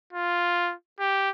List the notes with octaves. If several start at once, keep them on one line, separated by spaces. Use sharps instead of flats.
F4
G4